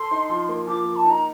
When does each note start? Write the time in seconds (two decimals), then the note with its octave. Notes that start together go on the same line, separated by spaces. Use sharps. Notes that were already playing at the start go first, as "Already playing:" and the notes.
Already playing: A4 C6
0.11 D#4
0.29 F3
0.49 A#3
0.67 F3 D6
0.85 A#3
0.96 A5
1.05 D#4
1.10 A#5